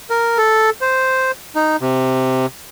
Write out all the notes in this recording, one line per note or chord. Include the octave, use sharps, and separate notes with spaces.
A#4
A4
C5
D#4
C3